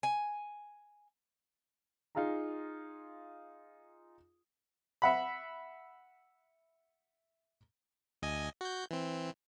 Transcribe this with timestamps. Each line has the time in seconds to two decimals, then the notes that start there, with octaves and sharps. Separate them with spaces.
0.03 G#5
2.15 D#4 F4 G#4 F5 A#5
5.02 E5 F#5 B5
8.22 D2 D#5 G#5
8.61 F#4 G6
8.91 E3 C4